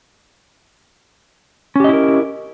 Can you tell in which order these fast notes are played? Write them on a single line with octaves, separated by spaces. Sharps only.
C#4 G4 D#5 E4 A#4